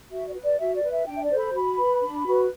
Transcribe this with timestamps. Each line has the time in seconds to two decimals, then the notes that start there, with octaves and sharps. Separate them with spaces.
0.11 F#4 E5
0.27 D5
0.35 B4
0.43 D5
0.59 F#4 E5
0.75 D5
0.83 B4
0.91 E5
1.07 D4 G5
1.15 E5
1.23 D5
1.30 A4 C5
1.38 B5
1.54 F#4 B5
1.78 B4
2.02 D4
2.26 F#4 B4